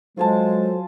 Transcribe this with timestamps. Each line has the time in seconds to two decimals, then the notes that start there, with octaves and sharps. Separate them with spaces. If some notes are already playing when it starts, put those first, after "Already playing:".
0.17 F#3 G#3 F4 A4 C5 G#5 A5